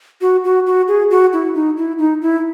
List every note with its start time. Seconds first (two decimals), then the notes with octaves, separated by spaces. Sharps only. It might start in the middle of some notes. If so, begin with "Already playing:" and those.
0.21 F#4
0.44 F#4
0.66 F#4
0.88 G#4
1.11 F#4
1.33 E4
1.54 D#4
1.77 E4
1.98 D#4
2.22 E4